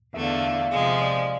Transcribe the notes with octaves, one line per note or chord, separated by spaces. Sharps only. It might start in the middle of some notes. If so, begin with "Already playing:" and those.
E2 D3 A3 E5
F5
E5
F5
E5
F5
E5
C3 F3 G#3 F5
E5
D5